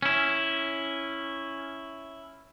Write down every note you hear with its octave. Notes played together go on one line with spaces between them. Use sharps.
C#4 E4